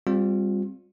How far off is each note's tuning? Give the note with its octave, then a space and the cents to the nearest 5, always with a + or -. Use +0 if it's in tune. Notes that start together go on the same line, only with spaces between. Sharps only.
G3 +25 C4 +0 F4 +30